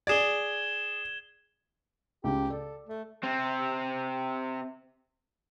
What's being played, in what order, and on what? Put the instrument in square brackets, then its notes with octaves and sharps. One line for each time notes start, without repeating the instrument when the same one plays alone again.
[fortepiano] G#4 D5 [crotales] G#6 E7 G7
[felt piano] C#2 C#3 [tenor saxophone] G4
[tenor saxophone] A4 [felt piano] D5
[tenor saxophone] A3
[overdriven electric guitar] C3 C4